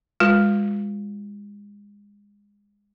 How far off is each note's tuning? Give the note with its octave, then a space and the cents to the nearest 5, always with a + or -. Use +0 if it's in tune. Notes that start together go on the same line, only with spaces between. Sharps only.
G#3 -25 F4 +35 B4 -10